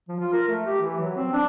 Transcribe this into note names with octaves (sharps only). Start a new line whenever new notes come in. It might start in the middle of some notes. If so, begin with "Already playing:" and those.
F3
F4
A#4
A3
G4
E3
F#3
C4
D4